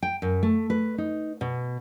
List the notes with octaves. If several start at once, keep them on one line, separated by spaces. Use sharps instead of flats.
G5
F#2
A3
B4
D#4
B2